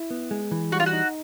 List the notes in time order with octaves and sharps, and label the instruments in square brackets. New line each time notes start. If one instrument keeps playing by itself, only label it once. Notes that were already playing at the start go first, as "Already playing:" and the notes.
Already playing: [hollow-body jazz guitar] E4
B3
G#3
E3
[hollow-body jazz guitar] G3 [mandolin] F#4
[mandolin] F4
F#4
[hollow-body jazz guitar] D#4